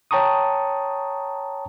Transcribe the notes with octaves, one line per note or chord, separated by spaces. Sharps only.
C#5 G5 A5 A#5 C#6 D#6